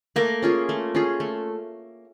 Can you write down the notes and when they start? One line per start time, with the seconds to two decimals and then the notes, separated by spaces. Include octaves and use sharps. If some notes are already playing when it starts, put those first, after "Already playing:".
0.16 A3 A#3
0.42 C#4 F4 G#4
0.69 A3
0.95 C#4 F4 G#4
1.20 A3